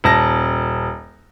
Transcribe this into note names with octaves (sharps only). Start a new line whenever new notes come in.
D#1 A5 A#6